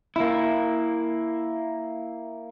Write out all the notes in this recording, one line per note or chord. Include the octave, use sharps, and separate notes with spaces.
A#3 E4